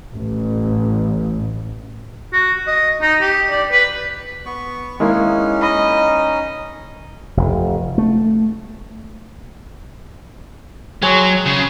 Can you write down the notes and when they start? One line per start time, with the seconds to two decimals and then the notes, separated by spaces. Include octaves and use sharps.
0.13 A1
2.33 F#4
2.67 D#5
3.02 D#4
3.21 G4
3.50 D5
3.72 B4
4.46 B3 C#6
5.00 G#3 A#3 C#4 D#4 E4
5.61 D#5 B5
7.37 F1
7.98 A3
11.02 F#3 G#3 C#5 G#5
11.46 C#3